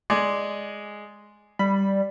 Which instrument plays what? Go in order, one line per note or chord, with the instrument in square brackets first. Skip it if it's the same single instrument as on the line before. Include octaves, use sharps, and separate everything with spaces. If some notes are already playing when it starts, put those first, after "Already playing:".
[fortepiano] G#3 D5 G#5
[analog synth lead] G3 [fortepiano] B5